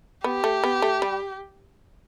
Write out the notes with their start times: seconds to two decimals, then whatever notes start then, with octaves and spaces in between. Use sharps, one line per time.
0.24 B3 G4
0.44 A3
0.64 B3
0.82 A3
1.02 G3